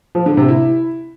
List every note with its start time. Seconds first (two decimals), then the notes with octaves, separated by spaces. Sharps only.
0.15 F3
0.26 D3
0.37 C3
0.48 E4